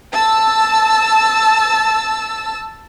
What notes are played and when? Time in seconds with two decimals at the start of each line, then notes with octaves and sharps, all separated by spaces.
0.12 A5 E6